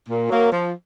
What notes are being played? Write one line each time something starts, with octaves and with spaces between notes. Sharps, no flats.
A#2
F#3 A#3
F3